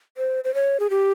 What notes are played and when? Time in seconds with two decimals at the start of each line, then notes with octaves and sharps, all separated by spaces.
0.17 C5
0.44 C5
0.55 C#5
0.80 G#4
0.90 G4